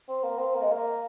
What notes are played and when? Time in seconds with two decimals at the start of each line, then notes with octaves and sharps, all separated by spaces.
0.08 C4
0.23 A#3
0.39 C4
0.55 A#3
0.63 G#3
0.72 A#3